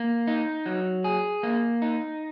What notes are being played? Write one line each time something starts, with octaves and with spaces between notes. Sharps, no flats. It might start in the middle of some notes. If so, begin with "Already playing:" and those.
Already playing: A#3
D#4
F#3
G#4
A#3
D#4